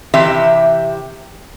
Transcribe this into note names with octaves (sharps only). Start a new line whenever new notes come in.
C3 E3 G4 E5